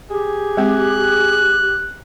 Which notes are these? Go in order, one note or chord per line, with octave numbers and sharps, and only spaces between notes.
G4 G#4
G#3 C4 F#6